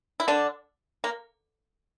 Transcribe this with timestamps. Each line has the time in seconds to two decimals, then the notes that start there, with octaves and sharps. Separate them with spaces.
0.20 E4
0.28 D3 D4
1.04 A#3